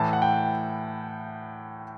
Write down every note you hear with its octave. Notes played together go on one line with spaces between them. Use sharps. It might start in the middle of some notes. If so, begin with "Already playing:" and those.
Already playing: A2 E3 A5
F#5
G5